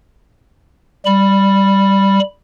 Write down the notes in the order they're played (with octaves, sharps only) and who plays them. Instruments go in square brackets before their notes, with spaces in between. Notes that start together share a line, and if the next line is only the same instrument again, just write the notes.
[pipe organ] G3 B5